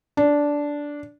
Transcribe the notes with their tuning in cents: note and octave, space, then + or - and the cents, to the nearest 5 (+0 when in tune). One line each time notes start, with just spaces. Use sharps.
D4 -10